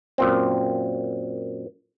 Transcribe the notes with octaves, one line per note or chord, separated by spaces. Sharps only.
F#2 A#2 C4